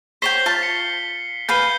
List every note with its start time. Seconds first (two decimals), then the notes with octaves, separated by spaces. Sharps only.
0.22 C5 C#5 G5 B6 C7 G7
0.46 F4 A5
0.63 C#7
1.49 B4 F5 G#5 G6 C7 G7